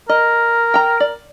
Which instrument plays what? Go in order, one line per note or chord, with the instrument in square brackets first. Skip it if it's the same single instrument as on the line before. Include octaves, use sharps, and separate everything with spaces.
[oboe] A#4 [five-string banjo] D#5
[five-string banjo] G5 A#5
D5